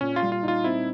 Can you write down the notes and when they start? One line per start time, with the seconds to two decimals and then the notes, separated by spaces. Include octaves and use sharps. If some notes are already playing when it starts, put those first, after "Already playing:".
0.01 A#2 C#4
0.16 F4
0.22 G3
0.32 F4
0.43 D#4 F4
0.64 C4 E4